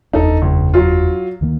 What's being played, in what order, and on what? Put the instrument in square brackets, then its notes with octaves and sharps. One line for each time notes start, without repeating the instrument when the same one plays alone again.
[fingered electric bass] F#1 E2 D4 [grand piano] D#4 A4
[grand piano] C#2
F#3 F4
[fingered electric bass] D2 D#3 A#3